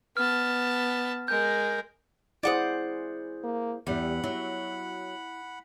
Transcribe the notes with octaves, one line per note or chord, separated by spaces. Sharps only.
B3 A5 F6
G#3 A#4 G6
E4 G#4 C5 D5 F#5 D#6
A#3
E2 E3 G3 F#5 B5
F#3 E4